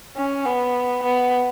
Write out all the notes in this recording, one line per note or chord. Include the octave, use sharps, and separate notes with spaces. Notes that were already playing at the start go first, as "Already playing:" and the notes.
C#4
B3
B3